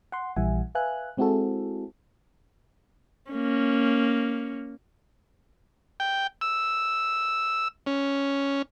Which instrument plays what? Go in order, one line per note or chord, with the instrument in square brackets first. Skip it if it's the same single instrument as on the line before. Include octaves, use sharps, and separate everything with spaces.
[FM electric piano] F#5 C6
A#1 E3 G3 E5 F#5 G#5
B4 E5 F5 G#5 F#6
G#3 C4 E4 F#4 G#4 A4
[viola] A#3 C#4
[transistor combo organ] G5
E6
C#4